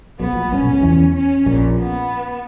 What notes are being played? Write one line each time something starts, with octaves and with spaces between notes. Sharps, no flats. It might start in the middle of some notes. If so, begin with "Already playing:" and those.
B1 B2 B3
A#1 A#2
G1 G2 C#4
B1 B2
C#2 C#3
E2 E3
C#4
A#1 A#2
B3